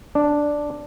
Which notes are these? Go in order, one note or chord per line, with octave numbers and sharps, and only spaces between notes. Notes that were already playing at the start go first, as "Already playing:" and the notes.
D4